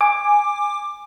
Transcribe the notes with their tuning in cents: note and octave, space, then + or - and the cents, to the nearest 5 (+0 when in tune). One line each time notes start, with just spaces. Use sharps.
G#5 -10 D6 +15